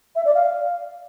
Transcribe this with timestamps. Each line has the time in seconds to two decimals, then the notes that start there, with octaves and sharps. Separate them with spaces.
0.16 E5
0.25 D5
0.35 F5